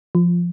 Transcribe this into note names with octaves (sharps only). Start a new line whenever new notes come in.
F3